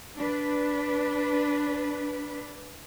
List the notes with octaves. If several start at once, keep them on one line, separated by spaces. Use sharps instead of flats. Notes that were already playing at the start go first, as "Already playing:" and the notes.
D4 B4